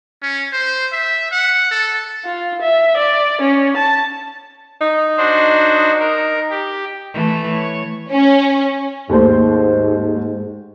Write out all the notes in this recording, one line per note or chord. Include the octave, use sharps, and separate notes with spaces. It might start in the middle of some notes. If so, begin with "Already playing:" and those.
C#4
C5
E5
F#5
A4
F4
E5
D5
C#4
A5
D#4
D4 F#4 C5
A#4
G4
E3 A3 A4
C#5
C#4
D#2 G#2 A3 C5